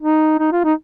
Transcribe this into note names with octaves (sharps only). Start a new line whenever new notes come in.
D#4
D#4
F4
D#4